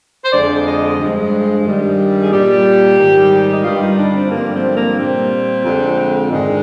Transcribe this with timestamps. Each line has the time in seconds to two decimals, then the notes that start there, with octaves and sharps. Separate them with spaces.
0.24 C5
0.31 F2 D3 G#3 D5
0.64 D#5
0.98 G2 F3 G#3
1.64 G2 D#3 G3
2.21 G#4
2.30 A#2 G3 G4
2.97 G#2 D#3 G3
3.52 D#4
3.63 G2 D3 G3 F4
3.81 D#4
3.97 D4
4.14 C4
4.30 G2 D3 F3 G#3 A#3
4.52 C4
4.74 A#3
4.96 A#2 G3 C4
5.63 F2 D3 G#3
6.30 G#2 D#3 G#3 D4